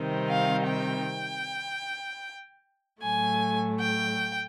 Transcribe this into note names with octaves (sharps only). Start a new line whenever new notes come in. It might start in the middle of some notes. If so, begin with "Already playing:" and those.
Already playing: C3 D#3 G3 C4 D#4
F5
G5
A2 F#3 A3 G#5
G5